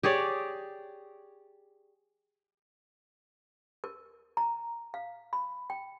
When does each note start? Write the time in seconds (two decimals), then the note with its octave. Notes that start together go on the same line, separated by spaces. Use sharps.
0.03 G4 G#4 C#5 D5
3.84 A#4
4.37 A#5
4.94 F5
5.33 B5
5.70 G5